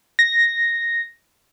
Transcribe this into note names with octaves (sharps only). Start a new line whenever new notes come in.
A#6